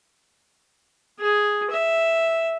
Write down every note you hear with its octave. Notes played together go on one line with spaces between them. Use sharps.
G#4
E5